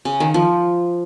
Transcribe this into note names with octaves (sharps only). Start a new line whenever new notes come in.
C#3
D#3
F3